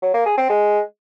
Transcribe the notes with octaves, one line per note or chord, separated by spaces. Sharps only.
F#3
A#3
G#4
C4
G#3